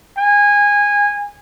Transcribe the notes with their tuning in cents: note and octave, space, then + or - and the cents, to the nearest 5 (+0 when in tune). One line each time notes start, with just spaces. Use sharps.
G#5 -20